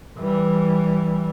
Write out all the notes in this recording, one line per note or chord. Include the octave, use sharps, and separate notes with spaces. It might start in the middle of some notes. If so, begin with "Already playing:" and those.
E3 G3